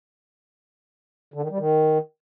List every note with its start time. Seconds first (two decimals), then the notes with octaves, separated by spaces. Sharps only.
1.34 D3
1.42 D#3
1.50 G3
1.59 D#3